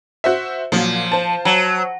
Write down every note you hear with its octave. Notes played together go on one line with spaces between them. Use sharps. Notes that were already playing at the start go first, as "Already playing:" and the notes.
F#4 C5 E5
A#2 F3 F#3
C5 A5
F#3